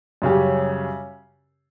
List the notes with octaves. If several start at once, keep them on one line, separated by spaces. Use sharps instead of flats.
F#2 C#3 G3 C#4 G4